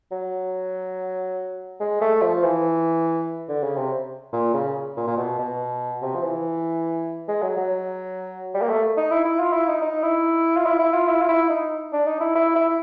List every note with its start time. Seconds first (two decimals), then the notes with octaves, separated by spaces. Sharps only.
0.12 F#3
1.80 G#3
2.02 A3
2.22 F3
2.43 E3
3.49 D3
3.63 C#3
3.77 C3
4.33 A#2
4.54 C#3
4.97 A#2
5.07 A#2
5.17 B2
5.39 B2
6.02 C3
6.15 F3
6.23 E3
7.28 G#3
7.42 F#3
7.57 F#3
8.54 G3
8.62 A#3
8.69 A3
8.97 D#4
9.11 E4
9.25 E4
9.40 F4
9.53 E4
9.68 D#4
9.82 D#4
10.03 E4
10.58 F4
10.66 E4
10.79 E4
10.94 F4
11.09 E4
11.22 F4
11.29 E4
11.50 D#4
11.93 D4
12.07 D#4
12.21 E4
12.35 E4
12.56 E4